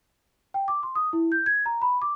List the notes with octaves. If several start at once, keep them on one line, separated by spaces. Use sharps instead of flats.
G5
D6
C6
D#6
E4
G6
G#6
A#5
B5
D6